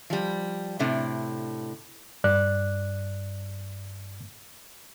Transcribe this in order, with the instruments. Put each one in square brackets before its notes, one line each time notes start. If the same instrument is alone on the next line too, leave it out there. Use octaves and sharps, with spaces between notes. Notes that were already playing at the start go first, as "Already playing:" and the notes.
[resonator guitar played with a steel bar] F3 G3
A2 C3 D4
[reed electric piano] G2 D5 F#6